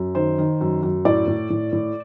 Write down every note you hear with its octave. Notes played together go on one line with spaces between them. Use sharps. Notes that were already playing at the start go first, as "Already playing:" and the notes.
Already playing: F#2
D#3 C5
D#3
F#2
F#2
A2 D5
A2
A2
A2